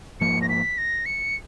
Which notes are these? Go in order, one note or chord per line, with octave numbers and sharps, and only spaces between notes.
G#2 F3 A#3 C#7
A#6
B6
A#6
C#7